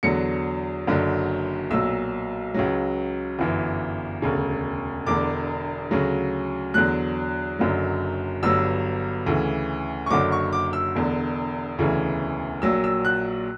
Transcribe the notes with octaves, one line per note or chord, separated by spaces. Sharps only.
E2 D3 F#3 C#7
F#1 F#2 D3 F#3
B1 A#2 F#3 E6
C#2 C#3 F#3
G1 F#2 E3
E1 D2 C#3
E1 E2 D3 D6
D2 C#3 F#3
E2 D3 F#3 F#6
F#1 F#2 D3 F#3
G1 G2 F#3 E6
D2 C#3 E3
C#6
F#1 F#2 D3 F#3 D6
C#6
D6
E6
E1 E2 D3
E1 D2 C#3 E3
A#1 A#2 F#3 E6
E6
F#6